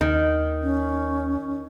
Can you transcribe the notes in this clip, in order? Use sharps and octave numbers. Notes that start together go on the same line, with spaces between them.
D#2 D#3
C#4